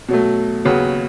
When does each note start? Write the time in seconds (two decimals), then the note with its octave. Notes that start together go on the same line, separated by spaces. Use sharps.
0.09 B2 F#3 A3
0.65 D#2 C#3 F#3 B3 F#4